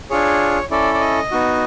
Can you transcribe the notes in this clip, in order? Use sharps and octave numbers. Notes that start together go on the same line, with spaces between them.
D4 F4 G#4 C#5
C#4 E4 A4 D5
D5
D#5
B3 D#4 F#4